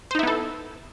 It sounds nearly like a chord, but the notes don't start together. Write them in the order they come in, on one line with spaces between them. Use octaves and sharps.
C5 D#4 E4 B3 A4